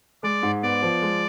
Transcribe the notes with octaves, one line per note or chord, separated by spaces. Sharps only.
G#3 D5
G#2
B3 D5
F3
G#3